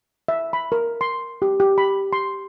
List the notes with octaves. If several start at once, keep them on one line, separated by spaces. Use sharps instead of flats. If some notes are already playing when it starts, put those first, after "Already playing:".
E5
B5
A#4
C6
G4
G4
B5
C6